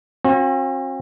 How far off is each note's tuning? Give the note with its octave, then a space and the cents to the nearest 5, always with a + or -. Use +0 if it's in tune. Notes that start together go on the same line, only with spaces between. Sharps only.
C4 +45 F#4 -35